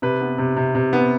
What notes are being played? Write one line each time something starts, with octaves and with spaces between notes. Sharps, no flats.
C3 B4
B3
C3
C3
C3
B3